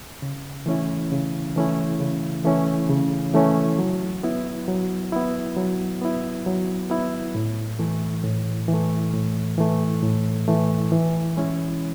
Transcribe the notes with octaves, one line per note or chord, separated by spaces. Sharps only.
C#3
E3 A3 C#4 E4
C#3
E3 A3 C#4 E4
C#3
E3 A3 C#4 E4
C#3
E3 A3 C#4 E4
F#3
B3 E4
F#3
B3 E4
F#3
B3 E4
F#3
B3 E4
A2
E3 A3
A2
E3
A3
A2
E3 A3
A2
E3 A3
E3
G#3 C#4 E4